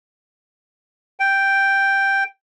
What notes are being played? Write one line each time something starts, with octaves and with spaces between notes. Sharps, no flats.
G5